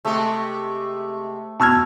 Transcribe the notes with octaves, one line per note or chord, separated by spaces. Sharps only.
C3 G#3 A3 G4 C#6
B2 A5 E6 F6 G#6